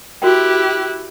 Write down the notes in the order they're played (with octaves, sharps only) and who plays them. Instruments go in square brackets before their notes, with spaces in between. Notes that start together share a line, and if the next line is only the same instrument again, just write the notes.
[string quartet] E4 G4 F#6 [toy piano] F#4 A#4 G5